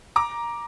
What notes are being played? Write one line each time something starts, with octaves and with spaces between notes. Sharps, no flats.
A#5 D6